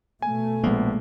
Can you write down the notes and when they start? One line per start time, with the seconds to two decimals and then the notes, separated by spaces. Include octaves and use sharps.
0.22 B2 A3 G#5
0.64 A#1 G#3 A#3 B3